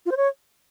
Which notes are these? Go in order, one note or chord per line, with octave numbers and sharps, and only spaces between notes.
F4
C5
C#5